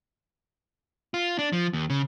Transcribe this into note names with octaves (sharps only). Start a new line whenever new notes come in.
F4
D4
F3
D#2
C#3